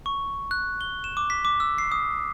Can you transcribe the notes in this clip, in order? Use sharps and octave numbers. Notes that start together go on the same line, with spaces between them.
C#6
F#6
G7
E7
D6
B6
D6
E6
C7
D#6